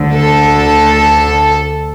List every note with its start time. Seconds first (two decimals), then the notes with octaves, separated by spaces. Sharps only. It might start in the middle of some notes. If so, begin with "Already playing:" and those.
Already playing: D2 D3
0.14 A4